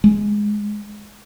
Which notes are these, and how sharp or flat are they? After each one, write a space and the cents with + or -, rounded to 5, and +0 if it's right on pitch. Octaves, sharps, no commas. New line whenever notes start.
G#3 +0